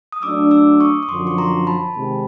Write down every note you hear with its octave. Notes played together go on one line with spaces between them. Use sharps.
D#6
F#3 A3 D4 D6 E6
D6 E6
C#6 D#6
D#6
F#2 D3 F3 C6 D6
C#6
A#5 C6
A5 B5
C3 D#3 G#3 C4